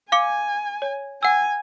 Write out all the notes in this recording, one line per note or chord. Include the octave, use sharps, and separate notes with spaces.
F5 G#5 D6 C#7
C#5
F#5 G#5 E6